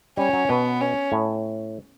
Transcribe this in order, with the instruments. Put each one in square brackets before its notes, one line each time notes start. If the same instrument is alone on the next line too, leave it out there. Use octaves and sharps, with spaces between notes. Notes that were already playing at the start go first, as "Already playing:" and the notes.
[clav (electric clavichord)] G3 [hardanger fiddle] C#4
[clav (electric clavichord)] F#3
[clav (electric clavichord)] B2 [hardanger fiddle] B3
[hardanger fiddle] C#4
[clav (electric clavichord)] A2